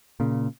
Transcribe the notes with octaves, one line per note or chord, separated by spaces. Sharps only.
A#2 C#3